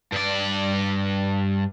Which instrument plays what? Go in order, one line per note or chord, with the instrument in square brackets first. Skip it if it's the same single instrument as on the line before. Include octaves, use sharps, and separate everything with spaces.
[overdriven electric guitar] G2 D5